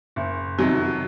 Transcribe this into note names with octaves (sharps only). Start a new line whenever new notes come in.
F#1
F2 C3 D#3 F#3